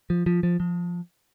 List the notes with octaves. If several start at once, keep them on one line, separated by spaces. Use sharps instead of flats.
F3
F3
F3
F3